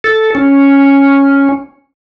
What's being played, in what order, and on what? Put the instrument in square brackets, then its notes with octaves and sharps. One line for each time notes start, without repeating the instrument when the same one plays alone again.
[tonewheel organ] A4
C#4